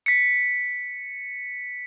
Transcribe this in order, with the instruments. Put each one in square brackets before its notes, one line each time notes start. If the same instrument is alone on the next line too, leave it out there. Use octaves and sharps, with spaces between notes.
[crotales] B6 C#7